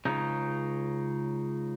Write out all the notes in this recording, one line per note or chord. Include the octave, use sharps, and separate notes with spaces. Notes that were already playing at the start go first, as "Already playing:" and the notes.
C#2 C#3 D#4